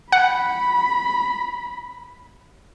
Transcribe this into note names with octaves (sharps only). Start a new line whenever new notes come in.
F#5 B5